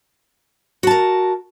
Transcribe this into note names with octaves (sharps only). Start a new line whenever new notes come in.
F#4 A#4 A5